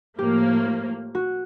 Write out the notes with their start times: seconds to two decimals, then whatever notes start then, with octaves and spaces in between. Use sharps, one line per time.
0.18 A2 F3 A#3 G4
1.15 F#4